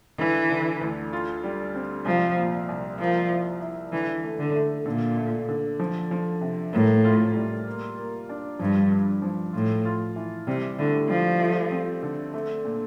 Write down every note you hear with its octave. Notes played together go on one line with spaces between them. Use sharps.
D3 E3
D3
D2
F4
G3
C4
C2 F3
A#2
C2
F3 A#3
E4
E4
D3 E3
A3
D3
A3
A#2 D3
A3
D3
F3
F3
C3
A2 A#3
F4
G3
A#3
A#3
D4
G2 F3
G2
F3
A2 F4
F4
E3
C3 G3
A2 D3
F3 G3
A3
C4
D3
A3
A#2